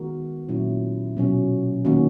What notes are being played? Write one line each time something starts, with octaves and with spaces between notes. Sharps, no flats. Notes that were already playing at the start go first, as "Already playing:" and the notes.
Already playing: D#3 G#3 B3 F#4 A#4
A#2 F#3 C#4 E4
B2 F#3 C#4
D#3 A#3 C#4 F#4